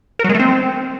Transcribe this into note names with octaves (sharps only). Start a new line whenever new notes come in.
A#4
F#3
G#3
A3
C4